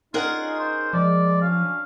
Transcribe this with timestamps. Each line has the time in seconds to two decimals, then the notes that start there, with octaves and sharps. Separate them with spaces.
0.14 C#4 D#4 F4 G#4 A#4 F#5
0.60 C5
0.93 F3 G#3 D5
1.42 F#3 C#4 D4 F5